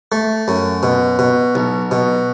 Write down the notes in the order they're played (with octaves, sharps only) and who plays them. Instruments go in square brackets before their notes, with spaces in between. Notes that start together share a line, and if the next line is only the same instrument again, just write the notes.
[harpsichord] A3
F#2
B2
B2
B1
B2